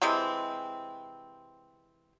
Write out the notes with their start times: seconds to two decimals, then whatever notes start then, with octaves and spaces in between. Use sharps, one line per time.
0.02 C3 E3 G#3 C4